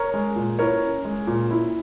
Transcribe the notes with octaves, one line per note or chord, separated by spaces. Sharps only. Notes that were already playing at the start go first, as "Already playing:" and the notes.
Already playing: A#4 C#5
G#3
A#2
E4 A#4 C#5
C#4
G#3
A#2
E4